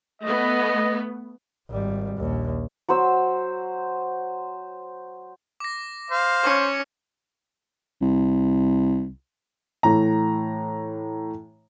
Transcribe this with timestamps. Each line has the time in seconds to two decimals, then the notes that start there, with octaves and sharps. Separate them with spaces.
0.22 A3 B3 D#5
1.70 G#1 G3
2.18 A#1 D#2
2.89 F#3 C5 E6
5.60 D6 A#6
6.11 C5 F5
6.43 C#4 C#5 D6 C#7
8.02 C2
9.83 A2 E3 A#5